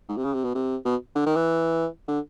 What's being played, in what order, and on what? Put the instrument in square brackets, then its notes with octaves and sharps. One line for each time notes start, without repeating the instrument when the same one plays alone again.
[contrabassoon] G#2
C3
C#3
C3
B2
C3
B2
D3
D#3
E3
D3